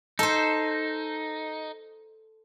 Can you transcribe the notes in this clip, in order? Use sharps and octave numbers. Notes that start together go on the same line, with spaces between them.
D#4 A4 C5